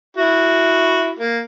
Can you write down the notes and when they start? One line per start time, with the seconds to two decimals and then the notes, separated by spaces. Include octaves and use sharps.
0.17 E4 F#4
1.19 A#3